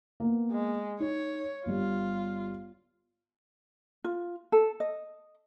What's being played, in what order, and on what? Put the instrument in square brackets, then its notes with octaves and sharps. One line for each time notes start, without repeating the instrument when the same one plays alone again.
[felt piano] A#3 B3
[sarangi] G#3
[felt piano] D#4 [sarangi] C#5
[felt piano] G1 G2 [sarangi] F4
[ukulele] F4
A4
D#5